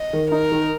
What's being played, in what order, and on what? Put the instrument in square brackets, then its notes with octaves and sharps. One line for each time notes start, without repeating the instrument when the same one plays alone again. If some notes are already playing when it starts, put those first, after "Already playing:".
Already playing: [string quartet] D#5
[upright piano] D#3
[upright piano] D#4 [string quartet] A#4
[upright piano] D#3